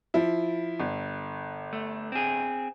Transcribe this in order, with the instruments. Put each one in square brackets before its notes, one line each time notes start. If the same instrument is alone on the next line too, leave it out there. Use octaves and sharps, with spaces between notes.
[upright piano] F3 E4
G1
[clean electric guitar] A3
C4 G#4